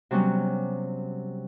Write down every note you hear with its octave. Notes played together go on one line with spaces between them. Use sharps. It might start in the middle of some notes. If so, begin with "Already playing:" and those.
C3 F#3 G3 B3 C#4